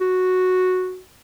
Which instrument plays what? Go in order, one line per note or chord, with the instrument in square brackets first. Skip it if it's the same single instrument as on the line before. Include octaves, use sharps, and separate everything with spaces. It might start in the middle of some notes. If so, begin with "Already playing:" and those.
[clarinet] F#4